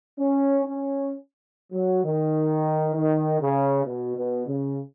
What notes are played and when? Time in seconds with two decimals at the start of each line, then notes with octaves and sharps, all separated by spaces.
0.19 C#4
0.66 C#4
1.72 F#3
2.03 D#3
2.95 D#3
3.40 C#3
3.85 B2
4.17 B2
4.47 C#3